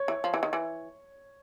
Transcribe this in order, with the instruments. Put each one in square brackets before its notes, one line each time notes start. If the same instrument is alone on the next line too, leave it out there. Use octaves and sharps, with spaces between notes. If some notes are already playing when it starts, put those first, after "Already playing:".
Already playing: [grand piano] C#5
[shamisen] E3
F3
E3
D#3
E3